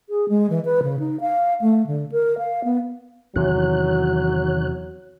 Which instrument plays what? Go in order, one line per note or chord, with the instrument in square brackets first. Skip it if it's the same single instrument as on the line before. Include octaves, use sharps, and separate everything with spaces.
[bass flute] G#4
G#3
E3
B4
C#3
D#4
F5
A3
D3
A#4
F5
B3
[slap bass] E2 C3 E3 [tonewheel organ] D#3 C#5 F#6 [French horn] F#3